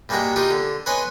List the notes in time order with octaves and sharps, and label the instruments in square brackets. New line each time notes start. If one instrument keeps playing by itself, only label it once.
[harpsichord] G2 G3 G#3 A#3 F#4 G5
D#4 F4 G4 A#4
D3
B4 C#5 D#5 G#5 C6